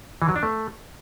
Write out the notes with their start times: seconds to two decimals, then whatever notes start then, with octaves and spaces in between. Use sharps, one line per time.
0.22 E3
0.29 F#3
0.36 D4
0.43 A3